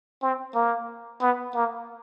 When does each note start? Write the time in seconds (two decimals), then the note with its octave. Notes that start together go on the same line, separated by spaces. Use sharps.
0.22 C4
0.55 A#3
1.21 B3
1.55 A#3